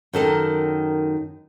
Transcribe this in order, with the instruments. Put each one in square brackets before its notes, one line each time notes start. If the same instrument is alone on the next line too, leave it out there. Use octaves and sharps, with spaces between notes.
[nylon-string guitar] F#2 D#3 A4 A#4